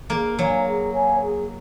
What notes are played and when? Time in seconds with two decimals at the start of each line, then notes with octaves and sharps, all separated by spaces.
0.10 A#3 G#4
0.38 F#3 C#5 F5 G#5
0.66 G#4
0.94 C#5 F5 G#5
1.21 G#4